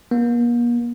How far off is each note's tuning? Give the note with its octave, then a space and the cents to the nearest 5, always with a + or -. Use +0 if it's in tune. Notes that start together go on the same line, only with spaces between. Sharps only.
A#3 +40